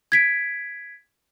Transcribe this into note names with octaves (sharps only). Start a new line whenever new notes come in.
G#6 B6 D7